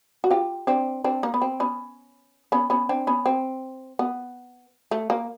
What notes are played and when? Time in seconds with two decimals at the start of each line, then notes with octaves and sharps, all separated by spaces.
0.24 F#4
0.30 F4 G4
0.67 C4 D4
1.04 C4 D4
1.23 A#3
1.34 B3
1.42 C4
1.60 B3 C#4
2.52 B3 C#4
2.70 B3 C#4
2.89 C4 D4
3.07 B3 C#4
3.26 C4
3.99 B3
4.91 A3
5.10 A#3